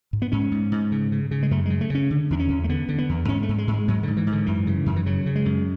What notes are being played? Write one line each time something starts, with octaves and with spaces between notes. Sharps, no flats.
G#2
B3
G#2 C#4
G#2
G#2
C#3
C#3
C#3
G#3
F#2 A3
C#3 G#3
A3
C#3 C#4
D3
E2 D4
C#4
E2
A3
D3 B3
D3
B3
E2
G#2 C#4
A3
G#2
G#3
G#2
G#3
G#2 F#3
G#2 D3
E3
G#2
D3
F#2 E3
C#3
F#2
E3
C#3 F#3
C#3
G#3
F#2